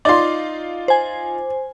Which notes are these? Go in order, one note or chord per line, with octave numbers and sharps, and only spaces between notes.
D#4 F4 D5 C6
C5 G#5